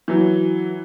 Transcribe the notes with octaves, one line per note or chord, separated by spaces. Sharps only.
E3 F#3